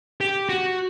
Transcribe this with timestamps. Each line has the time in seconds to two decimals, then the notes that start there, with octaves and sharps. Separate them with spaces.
0.21 G4
0.49 F#4